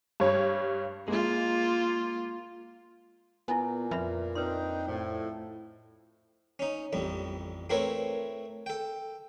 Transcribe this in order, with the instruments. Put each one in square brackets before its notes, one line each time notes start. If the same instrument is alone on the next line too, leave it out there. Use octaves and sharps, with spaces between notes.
[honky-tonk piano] G2 G3 C#5
[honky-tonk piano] G#3 [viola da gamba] A#3 F4
[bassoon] A#2 [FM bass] B3 [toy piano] E4 G#5
[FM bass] F2 [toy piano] B4 E5 B5
[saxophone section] C4 D4 D#4 [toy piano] B4 C6
[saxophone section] A2 [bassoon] F3
[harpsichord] C#4 D#4
A1 F2 G3
A3 C4 E4 A#4 B4 C#5
A4 G5